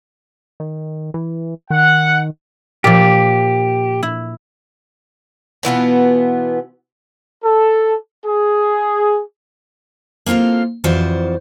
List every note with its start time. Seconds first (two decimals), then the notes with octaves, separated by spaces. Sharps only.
0.60 D#3
1.14 E3
1.70 D#3 F#5
2.84 A#2 F3 G4
4.03 E4
5.63 B2 E3 B3 F4
7.44 A4
8.25 G#4
10.26 A#3 C4 F4 A4 F5
10.84 F2 E3 F4 F#4 C5 D5